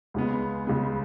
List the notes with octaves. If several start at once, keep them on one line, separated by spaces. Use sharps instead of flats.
C#2 C#3 G#3 B3
C#2 C#3 G#3 B3